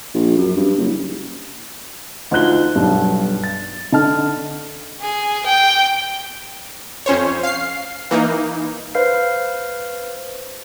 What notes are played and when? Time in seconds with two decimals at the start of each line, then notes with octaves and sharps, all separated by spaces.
0.14 A#1
0.38 F#2
0.57 G2
0.78 F#1
2.31 D2 D#4 F4 F#6 G7
2.76 B1 G2
3.44 A6
3.92 D3 D#5 A5 F6
5.00 G#4
5.46 G5
7.06 F2 C#4 C5 C#5
7.43 F5 C7
8.11 E3 A#3 D#4
8.95 B4 C5 F5 F6 C7